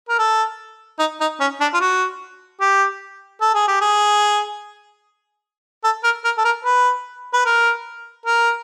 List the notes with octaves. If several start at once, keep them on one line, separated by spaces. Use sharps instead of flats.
A#4
A4
D#4
D#4
C#4
D4
F4
F#4
G4
A4
G#4
G4
G#4
A4
A#4
A#4
A4
A#4
B4
B4
A#4
A#4